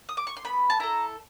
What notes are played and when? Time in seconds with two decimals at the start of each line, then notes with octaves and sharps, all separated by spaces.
0.09 D#6
0.17 D6
0.27 C#6
0.37 C6
0.45 B3 B5
0.70 A5
0.80 E4 A4 A#5